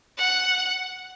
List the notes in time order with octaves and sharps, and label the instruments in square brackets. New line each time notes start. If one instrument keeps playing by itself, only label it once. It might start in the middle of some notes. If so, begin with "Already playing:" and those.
[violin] F#5